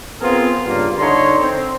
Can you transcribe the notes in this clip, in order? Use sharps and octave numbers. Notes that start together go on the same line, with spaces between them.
B3 C4 F4 G#4 A#4
G2 C#3 A#3 F4
D3 D#4 C#5 A#5 C6
C4